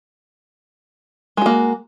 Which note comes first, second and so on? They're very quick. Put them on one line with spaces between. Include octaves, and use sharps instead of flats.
G#3 F#4 A#3